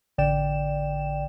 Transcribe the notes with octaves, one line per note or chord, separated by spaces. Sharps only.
A1 D3 D5 G5 E7